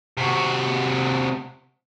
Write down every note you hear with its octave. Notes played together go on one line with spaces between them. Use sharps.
C3 F#4